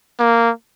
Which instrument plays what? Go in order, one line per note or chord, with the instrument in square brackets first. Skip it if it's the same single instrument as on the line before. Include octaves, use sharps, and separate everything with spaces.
[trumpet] A#3